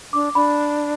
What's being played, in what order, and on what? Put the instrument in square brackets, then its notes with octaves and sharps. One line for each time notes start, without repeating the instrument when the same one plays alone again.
[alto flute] D4 [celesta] D6
[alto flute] D4 [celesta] B5